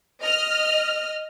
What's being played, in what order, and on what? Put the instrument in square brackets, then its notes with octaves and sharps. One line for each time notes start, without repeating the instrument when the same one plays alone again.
[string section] D#5 F6